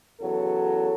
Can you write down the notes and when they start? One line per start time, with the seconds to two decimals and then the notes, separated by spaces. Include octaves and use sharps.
0.21 E2 C#3 F#3 A4